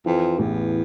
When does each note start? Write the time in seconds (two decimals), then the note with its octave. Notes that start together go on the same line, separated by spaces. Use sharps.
0.06 F2 E3
0.39 A1 E2